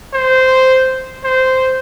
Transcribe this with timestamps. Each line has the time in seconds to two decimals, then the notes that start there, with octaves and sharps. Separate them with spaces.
0.14 C5
1.24 C5